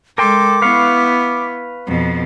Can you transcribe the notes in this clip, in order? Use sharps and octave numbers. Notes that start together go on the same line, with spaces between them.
G#3 A4 A#4 G5 C6 D6
B3 E4 B4 F5 C#6
F2 B2